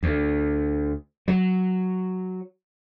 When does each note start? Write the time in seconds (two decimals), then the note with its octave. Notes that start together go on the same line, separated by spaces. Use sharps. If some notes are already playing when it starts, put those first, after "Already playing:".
0.03 D2
1.28 F#3